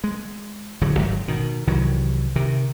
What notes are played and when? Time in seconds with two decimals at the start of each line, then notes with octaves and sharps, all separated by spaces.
0.04 G#3
0.81 D1 D3 F#3
0.98 G#1 G#2 D#3 F#3
1.28 B2 D#3
1.67 C2 D#3 E3 F#3
2.36 C3 D#3